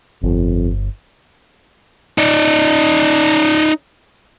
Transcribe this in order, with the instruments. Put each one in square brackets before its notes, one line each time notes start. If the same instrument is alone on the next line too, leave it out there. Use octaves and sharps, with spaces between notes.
[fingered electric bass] G1 [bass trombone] F2
[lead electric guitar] D#4 D5